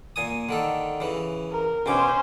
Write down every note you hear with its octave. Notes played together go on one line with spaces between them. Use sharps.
A#2 G#5 D#6
D3 D#3 A4
C#3 E3
A#4
B2 C#4 C5 D6